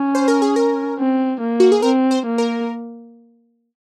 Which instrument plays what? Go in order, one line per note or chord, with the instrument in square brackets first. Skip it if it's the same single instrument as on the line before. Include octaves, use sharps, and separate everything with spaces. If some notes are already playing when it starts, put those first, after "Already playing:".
Already playing: [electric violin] C#4
[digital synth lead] C5
A#4
G#4
A#4
[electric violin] C4
A#3
[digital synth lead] F#4
G#4
[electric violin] C4 [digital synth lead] A#4
[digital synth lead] C5
[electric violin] A#3
[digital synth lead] A#4